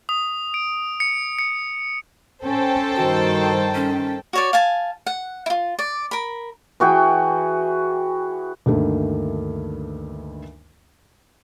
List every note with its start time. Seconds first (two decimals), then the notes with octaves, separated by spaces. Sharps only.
0.09 D#6
0.54 D7
1.00 C#7
1.39 C#7
2.44 C#4 A4 C5 G5
2.96 G2 D#3 F#4
3.75 C#4
4.33 F#4 C#5 D5
4.53 F5 G#5 A5
5.06 F#5
5.46 E4 F4
5.79 D5
6.11 A#4 B5
6.80 E3 F#4 G#4 G5
8.66 D2 G2 D#3 A3 A#3